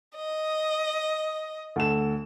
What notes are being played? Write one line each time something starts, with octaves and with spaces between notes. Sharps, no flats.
D#5
D2 A4 E7